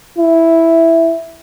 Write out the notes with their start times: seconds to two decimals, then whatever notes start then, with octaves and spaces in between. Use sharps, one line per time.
0.18 E4